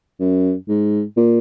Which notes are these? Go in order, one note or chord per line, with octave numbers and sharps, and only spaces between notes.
F#2
G#2
A#2